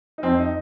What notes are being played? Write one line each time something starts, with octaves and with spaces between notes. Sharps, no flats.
D#4
F2 C4
D#4